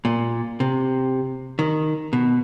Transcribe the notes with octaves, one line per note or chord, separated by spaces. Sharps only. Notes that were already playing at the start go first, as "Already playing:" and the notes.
A#2
C3
D#3
B2